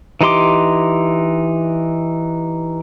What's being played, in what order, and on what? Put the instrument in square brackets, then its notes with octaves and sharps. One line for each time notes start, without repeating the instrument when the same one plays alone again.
[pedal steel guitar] E3 D#4 G4 C6 D6